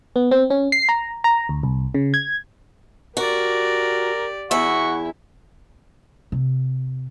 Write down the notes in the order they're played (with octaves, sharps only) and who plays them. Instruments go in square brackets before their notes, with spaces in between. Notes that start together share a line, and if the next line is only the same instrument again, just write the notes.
[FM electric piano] B3
C4
C#4
C7
A#5
A#5
D2
C2
C#3
G#6
[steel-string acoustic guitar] F#4 [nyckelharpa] G4 D5 [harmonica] A#4
[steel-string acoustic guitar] E2 E5 [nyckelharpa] E4 [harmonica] F#5 C#6
[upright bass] C3